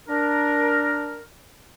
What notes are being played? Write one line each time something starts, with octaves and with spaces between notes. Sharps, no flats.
D4 A#4